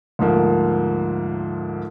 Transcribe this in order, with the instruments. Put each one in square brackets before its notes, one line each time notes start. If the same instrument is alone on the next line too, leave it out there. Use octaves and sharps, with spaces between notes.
[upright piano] D2 G#2 F3 A#3